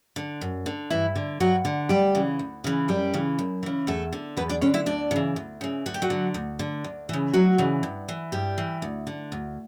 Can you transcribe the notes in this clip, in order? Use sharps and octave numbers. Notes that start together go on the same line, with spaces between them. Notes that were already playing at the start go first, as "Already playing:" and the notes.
D3
F#2
D3
G2 E3 E4
D3
G2 F#3 F#4
D3
D2 G3 G4
C#3 E3
D2
C#3 E3
F#2 G3 G4
C#3 E3
F#2
C#3 E3
E2 A3 A4
D3
E2 B3 B4
D4 D5
D3 C#4 C#5
E4 E5
D2 D4 D5
C#3 E3
D2
C#3 E3
D2 F#4
G4
F#3 F#4
D3
D2
D3
D2
C#3 E3
D2 F#3 F#4
C#3 E3
G2
E3
G2 G3 G4
E3
D2
D3
D2